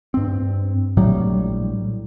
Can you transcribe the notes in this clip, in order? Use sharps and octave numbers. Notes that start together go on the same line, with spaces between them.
G2 C4
A#1 A2 F#3 G3